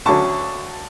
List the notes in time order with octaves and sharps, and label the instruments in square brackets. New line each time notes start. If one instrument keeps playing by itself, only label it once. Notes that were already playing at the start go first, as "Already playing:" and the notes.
[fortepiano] D2 D3 F#3 C#4 [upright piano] A5 C#6